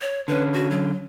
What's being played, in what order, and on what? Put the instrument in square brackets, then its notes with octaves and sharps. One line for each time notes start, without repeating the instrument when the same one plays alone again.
[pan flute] C#5
[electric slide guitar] D3 C#4 [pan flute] B4
[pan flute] F#4
F#3